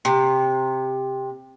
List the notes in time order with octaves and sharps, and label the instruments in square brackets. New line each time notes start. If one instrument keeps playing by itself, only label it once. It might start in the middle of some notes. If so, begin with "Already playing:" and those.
[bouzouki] C3